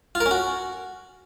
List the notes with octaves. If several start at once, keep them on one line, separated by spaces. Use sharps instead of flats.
F4
A#4
C#4
F#4